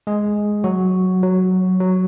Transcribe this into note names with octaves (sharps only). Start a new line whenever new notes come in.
G#3 G#4
F#3 F#4
F#3
F#3